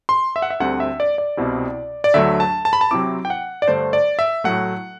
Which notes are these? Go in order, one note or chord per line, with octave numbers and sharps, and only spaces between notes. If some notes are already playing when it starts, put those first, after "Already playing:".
C6
E5
F#5
E5
D2 D3 G3 C4 F#5
E5
D5
D5
C2 B2 G3 C4 E4
D5
D2 D3 F#3 A3 E5
A5
A5
B5
A5
C3 F#3 C4 E4 D6
G5
F#5
D5
G2 D3 A3 D4 C5
D5
E5
A2 F#3 A3 F#5